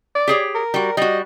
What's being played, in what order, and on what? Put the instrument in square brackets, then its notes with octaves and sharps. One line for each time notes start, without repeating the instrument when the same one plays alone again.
[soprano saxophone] D5
[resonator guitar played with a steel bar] G4 G#4 C#5
[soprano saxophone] A#4
[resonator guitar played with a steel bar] G3 F#4
[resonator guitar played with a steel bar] G3 F#4 [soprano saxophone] D#5